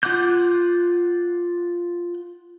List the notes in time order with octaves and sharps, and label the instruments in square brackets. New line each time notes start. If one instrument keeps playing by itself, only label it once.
[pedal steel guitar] F4 F#5 D6 F#6 G6